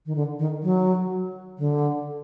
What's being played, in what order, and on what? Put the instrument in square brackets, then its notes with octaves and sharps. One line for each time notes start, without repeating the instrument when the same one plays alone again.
[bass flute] D#3
D3
D#3
F#3
D3